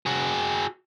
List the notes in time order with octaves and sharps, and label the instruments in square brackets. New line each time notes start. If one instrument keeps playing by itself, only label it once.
[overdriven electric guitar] F#4 G#4